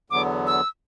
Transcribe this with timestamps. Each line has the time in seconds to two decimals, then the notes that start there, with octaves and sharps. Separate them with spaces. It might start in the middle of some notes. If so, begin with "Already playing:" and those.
0.10 E2 D3 F#3 B3 D6
0.47 E6